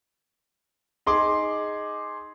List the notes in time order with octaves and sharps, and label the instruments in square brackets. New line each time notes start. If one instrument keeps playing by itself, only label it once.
[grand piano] D#4 G#4 C6 D6